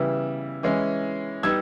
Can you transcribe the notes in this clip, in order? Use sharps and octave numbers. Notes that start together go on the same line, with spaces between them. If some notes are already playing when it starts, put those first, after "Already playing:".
Already playing: C#3 E3 G3 B3 E4 E6
E3 G#3 C#4 E4
G3 B3 D#4 E6 G#6